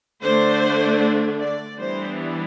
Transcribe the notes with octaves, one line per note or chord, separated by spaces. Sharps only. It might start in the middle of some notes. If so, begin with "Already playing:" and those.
D3 A3 D4 C5
D5
E3 G3 B3 D4 C5